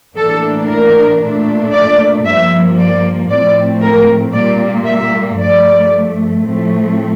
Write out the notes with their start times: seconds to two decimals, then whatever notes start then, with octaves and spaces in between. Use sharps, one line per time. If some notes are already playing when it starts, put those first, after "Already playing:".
0.16 A2 E3 A#3 D4 A4
0.68 A#4
1.21 A#2 A3 D4
1.73 D5
2.25 G2 F3 A#3 E5
2.78 D5
3.30 A2 F3 A3 C4 D5
3.81 A#4
4.34 A#2 G3 A#3 D5
4.86 E5
5.38 G2 F3 A3 D5
6.43 A2 F3 A3 C4